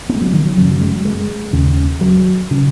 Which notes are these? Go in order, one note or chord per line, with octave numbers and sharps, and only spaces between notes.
B3
G#3
F#3
D#3
F#3
F#2 C#3 F#3
F#3
G#3
G#3
D#2 C#3
F#3
C#3